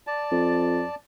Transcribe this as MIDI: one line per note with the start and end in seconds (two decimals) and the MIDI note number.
0.07 0.95 74
0.07 0.95 81
0.31 0.83 41